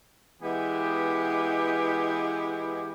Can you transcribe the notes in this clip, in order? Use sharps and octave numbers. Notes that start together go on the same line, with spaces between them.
E3 G#3 B3 G4